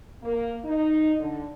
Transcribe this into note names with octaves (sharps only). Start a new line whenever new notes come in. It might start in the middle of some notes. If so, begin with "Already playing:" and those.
A#3
D#4
D3